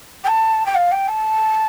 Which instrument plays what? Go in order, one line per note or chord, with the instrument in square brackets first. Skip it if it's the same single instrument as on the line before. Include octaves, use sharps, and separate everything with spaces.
[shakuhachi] G5
A5
G5
F5
G5
A5